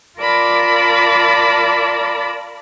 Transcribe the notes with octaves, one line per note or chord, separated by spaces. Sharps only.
F4 A#4 D5 A5 B5 D6